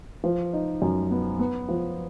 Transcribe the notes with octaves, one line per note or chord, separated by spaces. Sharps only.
F3
D#4
F#2
B3
B3
F3